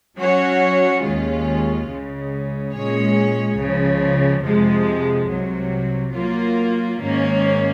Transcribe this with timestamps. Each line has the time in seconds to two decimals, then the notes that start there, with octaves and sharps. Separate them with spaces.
0.18 F#3 C#4 F#4 C#5
1.03 D#2 D#3 G#3 C#4 F4
1.88 C#2 C#3 G#3
2.73 A#2 G#3 C#4 G#4 C#5
3.59 C#2 C#3 F3
4.44 F2 C3 F3 G#3
5.29 C2 C3 F#3
6.14 F#3 A#3 F4 A#4
6.99 G#2 D#3 A#3 C#4